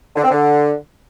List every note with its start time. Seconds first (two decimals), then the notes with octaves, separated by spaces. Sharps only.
0.16 D3
0.23 C4
0.31 D3